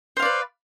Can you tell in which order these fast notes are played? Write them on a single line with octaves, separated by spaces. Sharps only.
C5 F5 D5 B4